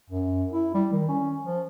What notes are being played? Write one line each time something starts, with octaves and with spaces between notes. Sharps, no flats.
F#2
E4
G3
D#3
C#4
F3